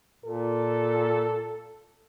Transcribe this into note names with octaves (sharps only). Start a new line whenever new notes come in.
A#2 A4